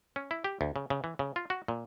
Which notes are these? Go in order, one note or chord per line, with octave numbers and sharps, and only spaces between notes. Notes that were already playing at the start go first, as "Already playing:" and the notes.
C#4
E4
G4
D2
C#3
C#3
E3
C#3
F4
F#4
A#2